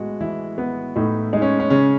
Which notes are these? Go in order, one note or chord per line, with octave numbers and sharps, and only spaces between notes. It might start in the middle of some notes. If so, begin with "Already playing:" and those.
Already playing: A2 G#3 B3 F#4
E3 E4
B3
A2 D#4
G#3 D#4
C#4
C#4
C#3 C#4